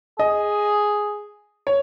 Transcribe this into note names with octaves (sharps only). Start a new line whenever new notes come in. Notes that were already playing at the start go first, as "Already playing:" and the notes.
G#4 D#5
C#5